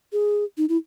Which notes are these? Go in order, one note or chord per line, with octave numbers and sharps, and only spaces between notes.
G#4
D#4
E4